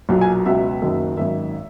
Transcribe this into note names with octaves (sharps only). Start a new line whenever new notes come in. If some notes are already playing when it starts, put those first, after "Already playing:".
B1 A#2 F#3
G#5
C#2 B2 F#3 E5
F#1 F#2 D#3 F#3
G#1 F#2 D#3 E5